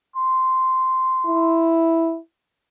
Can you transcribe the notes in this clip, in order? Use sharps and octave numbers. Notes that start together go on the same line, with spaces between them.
C6
E4